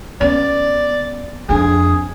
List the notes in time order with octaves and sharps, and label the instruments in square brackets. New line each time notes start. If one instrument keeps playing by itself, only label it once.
[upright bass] B3 C#4 [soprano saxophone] D5
[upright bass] F2 D4 [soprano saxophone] G#4